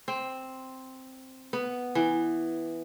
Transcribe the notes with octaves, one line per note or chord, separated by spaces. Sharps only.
C4
B3
E3